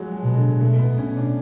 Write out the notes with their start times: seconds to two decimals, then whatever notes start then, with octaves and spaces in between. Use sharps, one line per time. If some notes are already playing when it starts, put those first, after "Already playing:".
Already playing: F3 F#3 G#3
0.12 G#3
0.23 B2
0.36 D3
0.61 B2 A3
0.79 B3
0.98 B2 C#4
1.17 D4